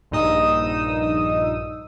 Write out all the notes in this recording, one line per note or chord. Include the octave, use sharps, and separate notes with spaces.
A#1 G2 D#4 D#6 E6